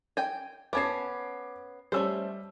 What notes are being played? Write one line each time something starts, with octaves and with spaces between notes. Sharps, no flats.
G5 G#5
B3 C#4 A5 D6 G#6 C7
G3 A3 C#4 C5 E6